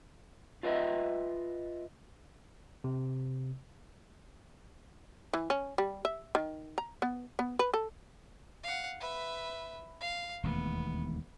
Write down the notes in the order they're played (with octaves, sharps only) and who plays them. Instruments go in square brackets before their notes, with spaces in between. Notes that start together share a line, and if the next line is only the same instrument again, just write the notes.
[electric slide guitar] F4 B4 C5 D#5 E5
[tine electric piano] C3
[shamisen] E3
C#4
G3
E5
D#3
A#5
B3
B3
B4
A4
[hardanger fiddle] F5 F#5
B4 E5
F5
[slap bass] E1 D#2 A3 [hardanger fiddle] B3